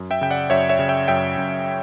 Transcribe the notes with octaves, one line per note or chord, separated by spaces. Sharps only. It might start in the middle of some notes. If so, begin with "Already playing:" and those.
Already playing: F#2
E5 G5
C#3 G5
D5 F#5
F#2 C#5 E5
C#5 E5
C#3
E5 G5
F#2 E5 G5
F#2